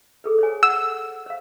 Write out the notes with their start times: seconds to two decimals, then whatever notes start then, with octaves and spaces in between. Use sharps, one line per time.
0.24 G#4 A4 B4
0.39 C5 C#5 G#5
0.63 F#5 E6
1.26 C5 F5